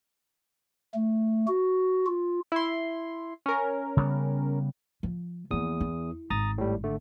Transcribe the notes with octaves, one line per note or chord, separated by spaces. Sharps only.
A3
F#4
F4
E4 C6
C#4 A#4
C#3 G3 B3
F3
E2 F3 A#3 D#6
E4
G#1 A#5 D#6 A6
A2 G3
D3 A3